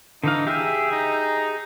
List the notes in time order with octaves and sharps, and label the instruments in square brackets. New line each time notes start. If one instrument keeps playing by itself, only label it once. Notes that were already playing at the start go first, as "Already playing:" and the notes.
[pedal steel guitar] D3 E3 F5 [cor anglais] D#4
[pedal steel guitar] G4 G#4 [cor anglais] E5
[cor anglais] D#4